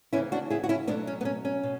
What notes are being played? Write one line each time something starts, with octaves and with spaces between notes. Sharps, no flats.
D2 C#3 E3 B3 C#4 E4
D4 F#4
E4 G#4
F#4
C#4 E4
B2 F#3 A3 B3 D4
C#4
B3
C#4
C#4
B2